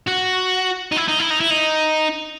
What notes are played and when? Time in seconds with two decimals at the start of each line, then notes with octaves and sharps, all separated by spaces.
0.07 F#4
0.92 D#4
0.96 E4
1.08 D#4
1.19 E4
1.30 D#4
1.41 E4
1.51 D#4